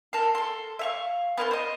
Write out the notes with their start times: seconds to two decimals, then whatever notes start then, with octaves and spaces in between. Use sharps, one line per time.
0.13 A4 A#4 C6
0.35 A4 C6
0.79 E5 F5 C#6
1.37 B3 A#4 G#5 C6
1.51 C5 D#5